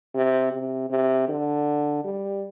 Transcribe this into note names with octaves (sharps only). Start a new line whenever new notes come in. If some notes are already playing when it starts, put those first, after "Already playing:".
C3
C3
C3
D3
G3